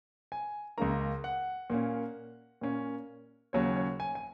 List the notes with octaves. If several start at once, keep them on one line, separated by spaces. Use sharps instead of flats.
G#5
C#2 C#3 A#3 A#5
F#5
A#2 A#3 C#4
A#2 A#3 C#4
D#2 C#3 F#3 C#4 C#5
C#5
G#5
G#5